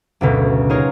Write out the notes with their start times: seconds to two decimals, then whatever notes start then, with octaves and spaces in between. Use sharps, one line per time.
0.21 F#1 D2 B2
0.70 D#4 F4 G#4 A#4 C#5